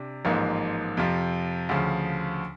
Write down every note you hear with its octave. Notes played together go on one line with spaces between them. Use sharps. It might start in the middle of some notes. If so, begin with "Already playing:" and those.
Already playing: C3 D4
A1 G#2 F3 A#3
F2 C3 F3
D2 C#3 F3